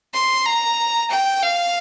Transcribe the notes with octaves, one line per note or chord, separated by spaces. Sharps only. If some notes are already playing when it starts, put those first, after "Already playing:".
C6
A#5
G5
F5